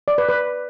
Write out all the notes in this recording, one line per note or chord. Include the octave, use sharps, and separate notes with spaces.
D5
B4
B4